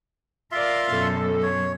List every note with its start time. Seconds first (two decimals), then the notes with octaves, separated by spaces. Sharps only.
0.52 F4 A#4 D5 E5 F5 C6
0.92 F#2 B2 A4
1.43 C#5